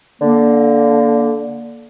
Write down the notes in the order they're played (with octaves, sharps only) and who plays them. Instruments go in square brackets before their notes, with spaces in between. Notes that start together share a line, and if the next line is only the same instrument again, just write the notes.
[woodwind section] D3 A#3